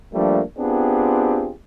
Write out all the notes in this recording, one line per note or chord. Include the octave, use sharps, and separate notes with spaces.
F3 G3 A3 A#3 D4
B3 C4 D4 F4 G4 G#4